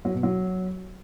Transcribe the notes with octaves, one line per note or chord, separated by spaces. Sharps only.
F#3
B2
F#3